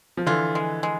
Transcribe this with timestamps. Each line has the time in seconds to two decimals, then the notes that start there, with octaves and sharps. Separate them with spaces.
0.17 F3
0.26 D3 E3 F4
0.55 G#3
0.83 G#3